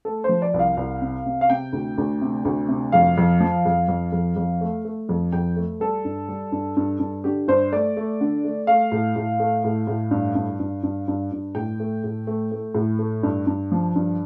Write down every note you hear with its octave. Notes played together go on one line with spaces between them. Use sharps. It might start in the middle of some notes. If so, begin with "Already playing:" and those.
A3 A4
F3 C5
D5
C2
F5
C2
C3
C3
F5
C3 G5
D2
D2
C3
D2
C3
F2 F5
F2
F3
F2
F2
F2
F2
A3
A3
F2
F2 G5
A3
G3 A4
G2
G3
G2
G2
G2
D3 G4
G2 C5
A3 D5
A3
D3
A3
A3 F5
A2
A2
A3
A2
A2
G2
G2
G2
G2
G2
G2
A2 G5
A3
A2
A3
A3
A2
A3
G2
G2
F3
G2